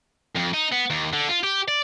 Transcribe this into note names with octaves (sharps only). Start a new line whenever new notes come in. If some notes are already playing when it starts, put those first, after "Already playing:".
F2
D#4
B3
D#2
D3
F4
G4
D5